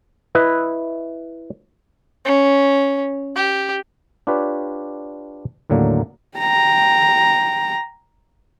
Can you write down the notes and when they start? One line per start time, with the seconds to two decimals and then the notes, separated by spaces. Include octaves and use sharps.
0.35 E4 B4 D#5
2.25 C#4
3.35 G4
4.27 D4 F4 G4 B4 C#5
5.70 D#2 A2 D3 F#3 A#3
6.38 G5 A#5